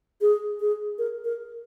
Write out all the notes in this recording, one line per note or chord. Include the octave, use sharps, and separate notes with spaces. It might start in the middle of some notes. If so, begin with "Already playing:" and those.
G#4
G#4
A#4
A#4